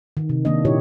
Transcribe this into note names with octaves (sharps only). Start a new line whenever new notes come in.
D#3
C3
D#3 A#3 D4 D#5
A#2 E4 F4 G4 C#5